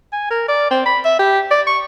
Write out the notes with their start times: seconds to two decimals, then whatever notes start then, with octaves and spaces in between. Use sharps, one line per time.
0.12 G#5
0.30 A#4
0.48 D5
0.70 C4
0.86 B5
1.05 E5
1.19 G4
1.51 D5
1.67 C#6